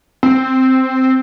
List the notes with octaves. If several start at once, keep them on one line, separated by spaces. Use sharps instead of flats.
C4